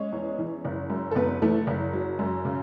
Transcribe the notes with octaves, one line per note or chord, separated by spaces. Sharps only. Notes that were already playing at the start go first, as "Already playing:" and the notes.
Already playing: G#3 C#4 C#5
E2
E3
F#1
F#2
A4
F#1 B3 B4
E3 A3 A4
F#1
F#3
F#2
C#3